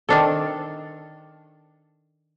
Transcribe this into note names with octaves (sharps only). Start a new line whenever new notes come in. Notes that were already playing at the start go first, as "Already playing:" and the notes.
D#3 D4 A4